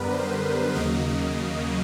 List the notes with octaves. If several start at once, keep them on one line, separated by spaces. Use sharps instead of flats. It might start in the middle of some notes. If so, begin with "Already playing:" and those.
Already playing: F#2 D3 G3 B3 A#4 B4
C5
D#2 C#3 F#3 A#3 D#5